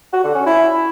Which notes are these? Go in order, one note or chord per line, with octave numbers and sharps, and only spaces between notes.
F#4
D3
C#4
E4